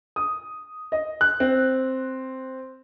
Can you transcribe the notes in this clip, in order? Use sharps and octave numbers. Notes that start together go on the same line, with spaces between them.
D#6
D#5
F#6
C4